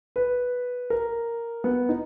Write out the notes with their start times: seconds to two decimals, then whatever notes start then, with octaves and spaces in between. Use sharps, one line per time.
0.16 B4
0.90 A#4
1.64 B3
1.89 D#4